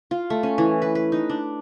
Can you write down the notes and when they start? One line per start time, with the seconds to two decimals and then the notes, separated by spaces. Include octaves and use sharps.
0.11 F4
0.30 A3
0.43 C#4
0.58 E3
0.82 B4
0.95 B4
1.12 D#4
1.29 D4